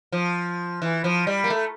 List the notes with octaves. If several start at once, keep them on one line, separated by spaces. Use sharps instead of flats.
F3
E3
F3
G3
A#3
A3